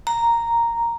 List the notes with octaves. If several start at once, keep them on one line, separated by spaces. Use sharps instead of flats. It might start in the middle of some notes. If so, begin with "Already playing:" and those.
A#5